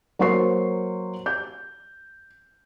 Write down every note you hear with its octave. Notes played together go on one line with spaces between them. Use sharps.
F#3 A#3 C5 C#6 C7
G6